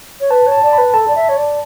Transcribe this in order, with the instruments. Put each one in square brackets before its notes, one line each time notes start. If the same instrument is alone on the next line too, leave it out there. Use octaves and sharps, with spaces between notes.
[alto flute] C#5
[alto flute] B4 [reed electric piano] A5
[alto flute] C#5
[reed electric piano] A5
[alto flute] D5 [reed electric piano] A5
[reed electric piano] B5
[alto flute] B4
[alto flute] A4 [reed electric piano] A5
[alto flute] D5
E5
C#5
D5